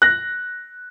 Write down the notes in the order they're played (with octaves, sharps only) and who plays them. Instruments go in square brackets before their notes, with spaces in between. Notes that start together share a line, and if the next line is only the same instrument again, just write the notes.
[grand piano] F#6 A#6